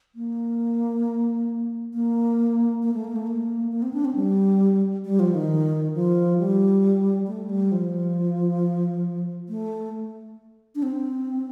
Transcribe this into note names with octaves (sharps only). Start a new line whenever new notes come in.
A#3
A#3
A#3
A3
A#3
A3
A#3
A#3
C4
D4
C4
G3
G3
F3
D#3
F3
G3
A3
G3
F3
A3
D4
C4